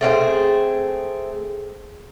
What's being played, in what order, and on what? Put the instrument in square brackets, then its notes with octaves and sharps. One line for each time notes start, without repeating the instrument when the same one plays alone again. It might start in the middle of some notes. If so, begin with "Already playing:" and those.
[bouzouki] A3 C4 F4 G#4